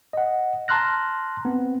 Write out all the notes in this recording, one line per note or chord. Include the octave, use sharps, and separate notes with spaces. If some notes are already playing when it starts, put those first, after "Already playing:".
D#5 F#5
A5 A#5 C6 F6 F#6 A#6
B3 C4